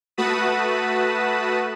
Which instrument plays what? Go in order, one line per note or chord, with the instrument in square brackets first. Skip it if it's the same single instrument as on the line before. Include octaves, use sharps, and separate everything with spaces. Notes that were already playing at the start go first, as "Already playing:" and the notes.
[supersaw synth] A3 F#4 B4 A5 B5 D#6